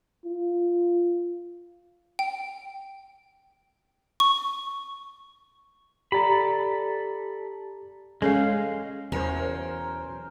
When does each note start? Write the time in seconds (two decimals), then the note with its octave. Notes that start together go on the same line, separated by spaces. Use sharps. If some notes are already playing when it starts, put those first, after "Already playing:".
0.25 F4
2.19 G5
4.20 C#6
6.12 G4 A4 D5 A#5 B5
8.22 G#3 C#4 G#4 A4 F5
9.12 E2 B2 F#3 C#4 A#4 C5